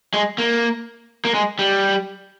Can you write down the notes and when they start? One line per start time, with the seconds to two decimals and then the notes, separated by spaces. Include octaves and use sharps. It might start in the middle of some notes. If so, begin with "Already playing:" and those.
0.14 G#3
0.38 A#3
1.25 A#3
1.34 G#3
1.59 G3